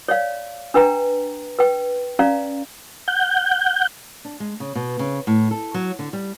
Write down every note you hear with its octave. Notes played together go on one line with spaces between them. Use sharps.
C#5 D5 F5
D4 B4 G5 A#5
B4 G5
C#4 D5 F5 A#5
F#5 G6
D4
G#3
C#3
B2
C#3
A2
A4
F#3
D3
G3